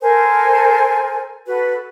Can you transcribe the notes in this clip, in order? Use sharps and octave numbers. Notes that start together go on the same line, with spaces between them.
A4 A#4 C5 G#5
F#4 A4 B4